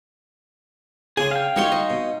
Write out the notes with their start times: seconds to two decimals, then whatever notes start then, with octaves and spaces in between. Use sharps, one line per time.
1.17 C#3 D4 G#4 G#5 C6
1.31 F5 G5
1.56 G3 D#4 F#4 G4 C#5 C6
1.72 D#5
1.90 B2